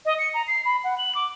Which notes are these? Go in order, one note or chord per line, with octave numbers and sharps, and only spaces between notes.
D#5
C#7
A#5
C7
B5
F#5
F#7
D6